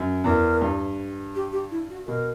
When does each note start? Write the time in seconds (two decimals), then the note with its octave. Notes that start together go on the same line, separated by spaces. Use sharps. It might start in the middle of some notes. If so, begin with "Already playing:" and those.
Already playing: F#2
0.24 E2 A#4
0.61 G2
1.35 G4
1.52 G4
1.71 E4
1.90 F#4
2.07 B2 A#4